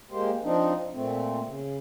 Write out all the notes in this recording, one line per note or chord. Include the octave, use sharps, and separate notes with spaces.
G#3 A#3 G4 C5
F3 C4 D4 D#4
A#2 A3 C4
C#3